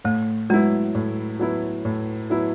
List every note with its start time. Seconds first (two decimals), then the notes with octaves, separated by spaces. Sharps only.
0.04 A2 A3
0.50 F#3 G#3 B3 E4
0.95 A2
1.39 F#3 B3 E4
1.85 A2
2.30 F#3 B3 E4